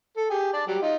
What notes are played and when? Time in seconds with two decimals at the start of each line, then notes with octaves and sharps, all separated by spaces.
0.17 A4
0.30 G4 G#4
0.53 D5 A5
0.67 F#3 G3 G4
0.82 D#4 F4